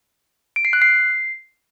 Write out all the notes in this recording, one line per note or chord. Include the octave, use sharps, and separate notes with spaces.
D7
C7
F#6
C7